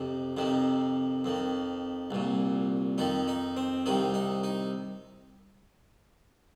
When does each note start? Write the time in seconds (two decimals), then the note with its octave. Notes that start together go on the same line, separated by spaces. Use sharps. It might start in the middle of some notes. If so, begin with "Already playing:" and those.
Already playing: F2 C3 D#4
0.37 F2 C3 D#3
1.24 F2 D#3
2.11 C2 A#2
2.98 F2 D#3 D#4
3.28 D#4
3.57 C4
3.86 C2 C3 D#3 D#4
4.14 D#4
4.43 D#4